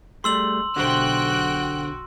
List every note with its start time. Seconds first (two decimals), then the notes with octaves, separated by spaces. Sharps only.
0.24 G3 A3 G#4 C6 E6 F#7
0.76 B1 D3 F#4 G4 C5 G5 F#6